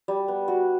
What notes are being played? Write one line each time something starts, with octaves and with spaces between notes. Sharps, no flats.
G3
B3
F#4